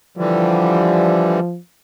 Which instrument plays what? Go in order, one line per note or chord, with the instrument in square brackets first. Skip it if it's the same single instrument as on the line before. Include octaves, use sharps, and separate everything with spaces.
[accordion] D3 E3 G3 [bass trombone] F3